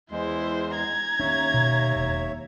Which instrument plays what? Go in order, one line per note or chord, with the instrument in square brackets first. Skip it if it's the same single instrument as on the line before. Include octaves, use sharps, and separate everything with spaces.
[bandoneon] E2 G#3 [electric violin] E4 C5
[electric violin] A#5 G#6
[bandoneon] D#2 C#5 E5 [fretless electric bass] C#4 D4
[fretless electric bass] B2
E1